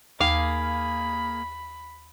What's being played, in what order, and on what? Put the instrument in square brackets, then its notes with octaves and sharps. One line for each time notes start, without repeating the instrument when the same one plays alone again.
[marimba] D#2 [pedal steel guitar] A#3 G#4 D6 [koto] F5 [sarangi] B5